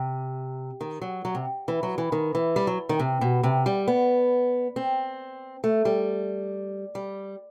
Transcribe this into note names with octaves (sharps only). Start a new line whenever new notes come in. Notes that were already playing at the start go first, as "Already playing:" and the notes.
Already playing: C3
D#3
F#3
F#3
C3
E3
F#3
E3
D#3
E3
G3
F#3
D#3
C3
B2
C3
G3
B3
C4
A3
G3
G3